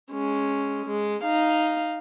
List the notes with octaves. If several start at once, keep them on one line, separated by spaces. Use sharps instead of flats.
G#3 C#4
G#3
D#4 F5